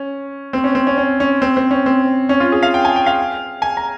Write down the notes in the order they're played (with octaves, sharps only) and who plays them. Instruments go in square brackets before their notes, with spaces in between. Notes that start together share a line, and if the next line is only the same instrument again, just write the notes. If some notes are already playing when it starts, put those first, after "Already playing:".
Already playing: [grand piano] C#4
C4
C#4
C4
C#4
C#4
C#4
C4
C4
C#4
C4
C#4
F4
G#4
F5
G5
G#5
G5
F5
G#5
A#5